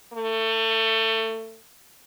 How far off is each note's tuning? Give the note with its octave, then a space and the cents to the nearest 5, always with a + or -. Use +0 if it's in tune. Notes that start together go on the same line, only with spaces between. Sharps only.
A3 +25